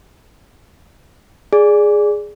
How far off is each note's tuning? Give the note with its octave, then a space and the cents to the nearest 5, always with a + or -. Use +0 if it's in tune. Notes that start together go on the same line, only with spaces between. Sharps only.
G#4 +0 D5 +0